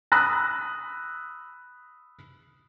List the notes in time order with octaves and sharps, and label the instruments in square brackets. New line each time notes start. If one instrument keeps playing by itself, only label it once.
[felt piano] B5 D#6 E6 F#6 A#6